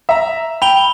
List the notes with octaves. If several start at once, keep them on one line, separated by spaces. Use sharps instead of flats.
E5 A#5
G5 B5 F7 G7